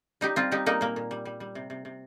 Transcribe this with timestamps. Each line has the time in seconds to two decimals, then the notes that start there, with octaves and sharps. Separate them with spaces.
0.21 G3 D#4 G4
0.36 G3 C4 F4
0.51 G3 D#4 G4
0.66 G3 A#3 D#4
0.81 A#2 A#3
0.96 A#2
1.11 G3
1.25 G3
1.40 G3
1.55 C3
1.70 C3
1.85 C3